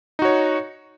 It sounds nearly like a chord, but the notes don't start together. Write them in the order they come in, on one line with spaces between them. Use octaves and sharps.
D#4 F#4 C#5